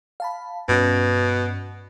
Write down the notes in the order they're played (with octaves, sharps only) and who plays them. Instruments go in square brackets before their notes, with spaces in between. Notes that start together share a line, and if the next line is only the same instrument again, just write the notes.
[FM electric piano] F5 A5 B5
[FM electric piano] G2 C#4 [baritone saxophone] B2